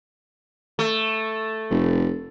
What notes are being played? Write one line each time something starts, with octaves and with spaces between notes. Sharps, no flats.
A3
F1